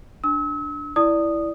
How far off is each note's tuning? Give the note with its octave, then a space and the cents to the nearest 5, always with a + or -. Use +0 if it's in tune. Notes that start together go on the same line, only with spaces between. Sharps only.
D4 +0 E6 -40
E4 +0 D5 +0 D#6 -10